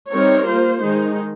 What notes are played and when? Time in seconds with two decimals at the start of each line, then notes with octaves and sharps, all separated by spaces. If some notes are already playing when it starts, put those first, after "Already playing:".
0.11 G3 C4 D#4 A#4 C#5
0.47 A#3 F4 C5
0.82 D#3 G#3 D#4